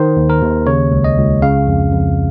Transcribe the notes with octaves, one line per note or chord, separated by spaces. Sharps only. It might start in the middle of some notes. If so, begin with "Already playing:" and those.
Already playing: D#3 C5
D#2
A#4
D#2
C#3 C#5
C#2
D#5
C#2
C#3 F5
F2
F2